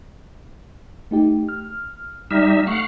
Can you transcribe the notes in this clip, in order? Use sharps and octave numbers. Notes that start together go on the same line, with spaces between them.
A3 D#4 G4
F6
G3 D#4 E5 F6
A3 F5 F#5 C#6